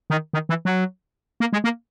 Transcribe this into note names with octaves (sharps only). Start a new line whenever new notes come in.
D#3
D#3
E3
F#3
A#3
G#3
A#3